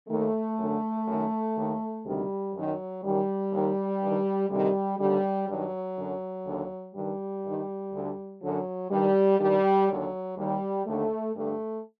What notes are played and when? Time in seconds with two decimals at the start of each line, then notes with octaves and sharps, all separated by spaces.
0.09 D#2 D#3 A3
0.58 F#2 D3
1.08 F#2 D#3
1.56 D#2 D#3
2.05 D2 C3 D#3 G3
2.54 F#2 D#3 F#3
3.03 F#2 D#3 G3
3.52 D#2 D#3
4.01 G2 D#3
4.50 D2 C3 D#3 G3
4.99 D#2 D3 G3
5.48 G2 D#3 F#3
5.96 F#2 D3
6.46 D#2 D3
6.95 G2 D#3 G3
7.43 G2 D#3
7.93 D2 D3
8.42 F#2 D3 F#3
8.90 G2 D#3 G3
9.40 G2 D#3 G3
9.88 D#2 D3 F#3
10.37 D#2 D#3 G3
10.86 D#2 D3 A3
11.35 G2 D3 A3